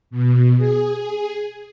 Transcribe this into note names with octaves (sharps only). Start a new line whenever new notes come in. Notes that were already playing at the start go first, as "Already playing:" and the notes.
B2
G#4